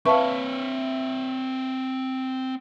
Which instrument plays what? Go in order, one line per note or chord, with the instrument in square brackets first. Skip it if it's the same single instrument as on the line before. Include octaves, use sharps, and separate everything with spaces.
[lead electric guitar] C4 C#5 [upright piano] B4 E5 [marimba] F5 A5 C#6